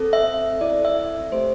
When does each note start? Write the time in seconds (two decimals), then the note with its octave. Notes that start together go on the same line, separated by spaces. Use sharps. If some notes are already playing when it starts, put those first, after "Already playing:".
Already playing: C4 A4
0.13 E5
0.61 C4 E4 A4 D5
0.85 E5
1.32 A3 C4 G4 C5